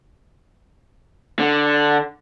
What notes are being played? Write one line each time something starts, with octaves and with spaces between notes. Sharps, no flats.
D3